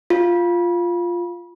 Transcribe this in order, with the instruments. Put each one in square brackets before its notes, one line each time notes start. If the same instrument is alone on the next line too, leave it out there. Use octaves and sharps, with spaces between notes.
[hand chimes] F4